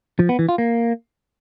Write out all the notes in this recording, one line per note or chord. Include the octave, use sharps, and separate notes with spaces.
F3
B3
E3
F4
A#3